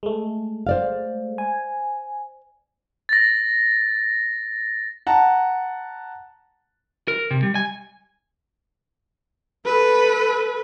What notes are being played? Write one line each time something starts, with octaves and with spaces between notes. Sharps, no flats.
G#3 A3
C5 D5 F5
G#5
A6 A#6
F#5 A5 A#5
A#4
C3
G3
G#5
A4 B4